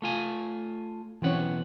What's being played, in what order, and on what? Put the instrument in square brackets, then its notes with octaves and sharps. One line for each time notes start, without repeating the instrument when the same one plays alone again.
[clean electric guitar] A3 F4 G#5
[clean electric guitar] B1 C4 F#5 [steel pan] E3 C#4 C#5